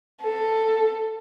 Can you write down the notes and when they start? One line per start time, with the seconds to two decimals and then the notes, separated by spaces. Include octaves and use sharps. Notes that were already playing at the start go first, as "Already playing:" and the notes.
0.23 A4